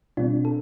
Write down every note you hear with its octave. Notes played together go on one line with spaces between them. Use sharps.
B2 G3 C4 D4 F4
A4